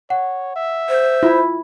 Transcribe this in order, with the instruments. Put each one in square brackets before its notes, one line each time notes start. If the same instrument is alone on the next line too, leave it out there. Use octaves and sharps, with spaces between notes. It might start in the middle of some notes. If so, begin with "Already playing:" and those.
[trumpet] C#5 [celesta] F#5
[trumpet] E5
[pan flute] C5
[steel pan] E4 [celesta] F4 B5